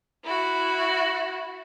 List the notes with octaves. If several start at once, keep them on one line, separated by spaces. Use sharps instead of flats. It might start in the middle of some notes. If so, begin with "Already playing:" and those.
E4 F#4